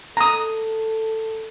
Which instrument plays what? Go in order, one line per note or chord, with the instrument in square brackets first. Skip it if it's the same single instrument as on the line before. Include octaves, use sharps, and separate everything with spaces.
[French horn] A4 [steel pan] A#5 D#6